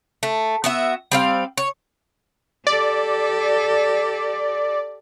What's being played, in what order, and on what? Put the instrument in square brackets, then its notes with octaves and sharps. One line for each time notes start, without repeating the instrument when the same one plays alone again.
[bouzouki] A3
B3 F#4 E5
G3 C4 F5
C#5
[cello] G4 A4 [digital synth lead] D5